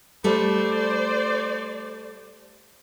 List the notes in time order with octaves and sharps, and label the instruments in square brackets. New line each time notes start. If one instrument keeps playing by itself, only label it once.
[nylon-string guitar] G3 A3 [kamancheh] C5 D5